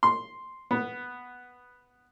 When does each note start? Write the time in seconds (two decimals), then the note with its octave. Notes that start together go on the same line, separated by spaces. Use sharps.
0.03 C6
0.71 B3